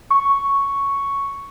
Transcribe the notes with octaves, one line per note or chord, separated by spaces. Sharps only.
C#6